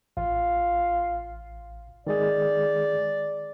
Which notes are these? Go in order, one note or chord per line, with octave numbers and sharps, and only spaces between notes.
A1 F4
D#3 G#3 G#4 D5